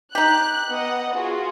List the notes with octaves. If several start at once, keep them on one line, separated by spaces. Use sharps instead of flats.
D#4 G4 F#6
B3 D#5 F#5
F4 F#4 G#4